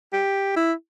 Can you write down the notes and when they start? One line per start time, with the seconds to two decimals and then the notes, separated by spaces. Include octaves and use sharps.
0.13 G4
0.56 E4